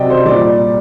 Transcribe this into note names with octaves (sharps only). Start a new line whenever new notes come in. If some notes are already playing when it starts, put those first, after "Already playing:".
Already playing: C3 F#3 D5 D#5 G5
C5
A#2 G3 D5